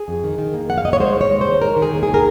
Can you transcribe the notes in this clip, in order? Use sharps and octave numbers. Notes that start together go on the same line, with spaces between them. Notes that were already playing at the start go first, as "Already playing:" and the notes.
Already playing: G#4
F2
D#3
D#3
A#3
F2 F#5
F5
A#3 D#5
C#5
G#3 C5
D#2
C#5
G#3
C5
D#3
G#3 A#4
D#3
G#4
D#2
D#3 G#4
A#4